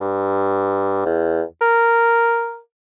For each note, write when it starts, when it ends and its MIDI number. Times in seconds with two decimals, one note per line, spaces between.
0.01 1.03 43
1.06 1.42 40
1.61 2.59 70